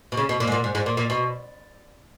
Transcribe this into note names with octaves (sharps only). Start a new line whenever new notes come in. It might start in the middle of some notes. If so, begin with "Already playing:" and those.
B2
C#3
B2
A#2
G#2
A#2
G#2
G#2
A#2
A#2
B2